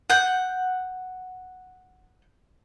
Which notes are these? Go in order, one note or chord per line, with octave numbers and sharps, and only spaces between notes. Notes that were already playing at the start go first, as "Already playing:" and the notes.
F#5 G6